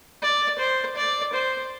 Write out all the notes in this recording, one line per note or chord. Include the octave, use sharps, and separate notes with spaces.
D5
C5
D5
C5